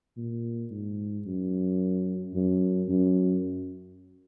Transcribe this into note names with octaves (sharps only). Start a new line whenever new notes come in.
A#2
G#2
F#2
F#2
F#2